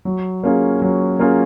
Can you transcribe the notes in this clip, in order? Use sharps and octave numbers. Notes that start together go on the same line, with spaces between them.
F#3
A#3 C#4 F4 G#4
F#3
A#3 C#4 F4 G#4